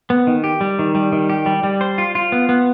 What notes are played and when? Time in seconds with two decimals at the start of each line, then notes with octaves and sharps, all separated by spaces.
0.10 B3
0.27 D#3
0.44 G4
0.61 G3
0.79 D#3
0.95 G3
1.12 D#3
1.29 G4
1.46 G3
1.63 G3
1.81 C5
1.98 F4
2.15 F4
2.32 B3
2.49 B3